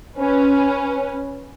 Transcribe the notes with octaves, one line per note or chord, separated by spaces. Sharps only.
C#4 B4